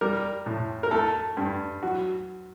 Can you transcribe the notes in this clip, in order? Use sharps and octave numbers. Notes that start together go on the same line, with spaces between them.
G3 A#4
A2
A#4
A3 A4
G2
F#3 F#4